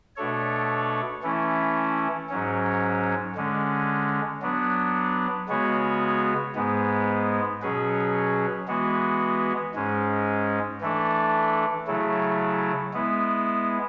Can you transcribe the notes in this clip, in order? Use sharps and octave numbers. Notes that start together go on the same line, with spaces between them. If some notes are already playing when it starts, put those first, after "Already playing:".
B2 A3 D4 A4 C#5
E3 A3 C#4 E4
G#2 F#3 C#4
D3 G#3 C#4
F#3 B3 D4
C#3 G#3 B3 F#4 C#5
G#2 G#3 B3
B2 F#3 C#4 G#4 B4
E3 G#3 B3 F#4
G#2 G#3 C#4
E3 A3 D4 A4
C#3 F#3 A3 E4
G#3 B3 E4